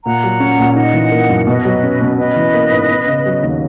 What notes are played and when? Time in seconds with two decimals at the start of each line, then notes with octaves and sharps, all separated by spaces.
0.05 A#2 F#5 A#5
0.24 F#3
0.40 C#4
0.59 A#2
0.76 D#4 D#5 F#5
0.94 E3
1.11 A#3
1.29 F#2
1.47 B2 B4 D#5
1.65 F#3
1.83 C#4
2.01 B2
2.18 C#4 B4 D#5
2.36 E3
2.54 A#3
2.71 G#2
2.89 B3
3.07 C#3
3.25 F#3
3.43 D#2